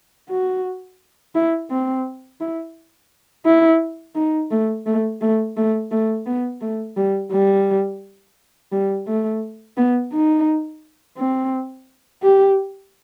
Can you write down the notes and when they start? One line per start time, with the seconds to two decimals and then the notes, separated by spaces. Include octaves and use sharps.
0.30 F#4
1.35 E4
1.71 C4
2.41 E4
3.45 E4
4.16 D#4
4.51 A3
4.86 A3
5.21 A3
5.57 A3
5.91 A3
6.26 B3
6.62 A3
6.97 G3
7.32 G3
8.72 G3
9.07 A3
9.77 B3
10.13 D#4
11.18 C4
12.23 G4